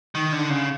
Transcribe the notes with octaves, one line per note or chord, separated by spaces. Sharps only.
D#3
D3
C#3